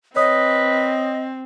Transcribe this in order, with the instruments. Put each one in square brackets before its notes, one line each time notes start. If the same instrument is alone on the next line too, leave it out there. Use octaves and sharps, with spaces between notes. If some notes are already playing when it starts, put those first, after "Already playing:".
[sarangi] C4 [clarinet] B4 [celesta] C#5 D#6 [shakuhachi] D#5